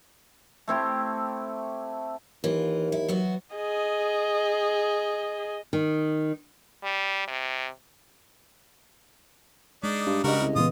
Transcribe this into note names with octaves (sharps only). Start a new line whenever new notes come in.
A3 C4 E4 G4
D#2 E3 F4
E4
F#3 B3 F#4
G#4 D#5
D#3
G3
C3
G#3 D4 D#4
G2
G2 C#3 G3 F#4 A#4 D#5
C2
A#2 E3 B3 F4 D#6